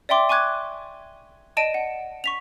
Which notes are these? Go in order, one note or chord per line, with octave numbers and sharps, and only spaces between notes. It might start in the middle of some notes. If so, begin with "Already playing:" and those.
D5 E5 G5 C6 D6
G#5 C#6 D6 F#6 G#6
D5 D#5 A5 D7 D#7
F#5
C#6 B6 F7